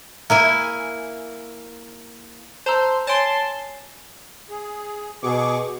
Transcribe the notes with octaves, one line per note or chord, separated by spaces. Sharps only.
A#3 E4 G#5
C5 A5 A#5 E6
C#5 G#5 A5 C6 D7
G#4
B2 G#4 C#6 D6